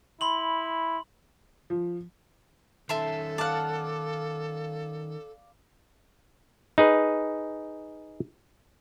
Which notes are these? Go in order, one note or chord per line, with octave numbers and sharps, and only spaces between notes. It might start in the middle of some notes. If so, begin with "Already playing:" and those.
E4 B5 C6 F#7
F3
D#3 C#4 A4 E5 A5 C6
D5 F5 F#5 A5
D#4 G#4 B4